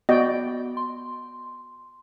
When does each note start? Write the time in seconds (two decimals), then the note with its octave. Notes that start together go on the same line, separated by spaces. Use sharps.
0.09 B3 F#4 D5 D#5 G5
0.77 C6